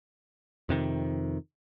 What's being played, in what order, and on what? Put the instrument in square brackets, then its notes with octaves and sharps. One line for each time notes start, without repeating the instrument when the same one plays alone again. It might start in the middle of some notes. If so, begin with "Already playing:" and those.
[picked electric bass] F2 C3 D#3